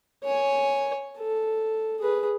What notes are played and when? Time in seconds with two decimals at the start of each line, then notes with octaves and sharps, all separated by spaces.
0.24 C#5 G#5
1.19 A4
2.00 G#4 B4